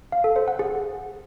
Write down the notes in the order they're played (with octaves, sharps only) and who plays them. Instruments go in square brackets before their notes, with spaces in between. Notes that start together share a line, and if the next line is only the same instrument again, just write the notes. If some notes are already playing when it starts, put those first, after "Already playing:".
[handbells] F5
A4
C5
F#5
G#4